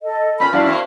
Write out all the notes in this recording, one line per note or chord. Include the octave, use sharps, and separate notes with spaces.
A4 D#5
A#2 B3 C#4 F4 B5
F#2 A#2 E4 F#4 D5 E5 F5 A5
A#3 C4